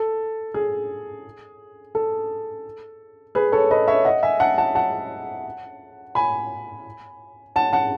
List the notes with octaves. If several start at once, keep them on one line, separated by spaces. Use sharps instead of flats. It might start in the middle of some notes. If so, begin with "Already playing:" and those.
Already playing: A4
G#4
A4
G#4 B4
A4 C#5
B4 D#5
C#5 E5
D#5 F#5
E5 G#5
F#5 A5
F#5 A5
F#5 A5
G#5 B5
F#5 A5
F#5 A5